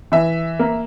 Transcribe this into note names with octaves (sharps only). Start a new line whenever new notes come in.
E3 E5
A#3